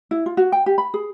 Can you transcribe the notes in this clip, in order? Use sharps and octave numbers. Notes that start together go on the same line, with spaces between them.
E4
F4
F#4
G5
G4
B5
G#4